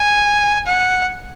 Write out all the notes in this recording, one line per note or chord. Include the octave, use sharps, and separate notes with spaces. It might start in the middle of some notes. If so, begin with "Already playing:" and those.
Already playing: G#5
F#5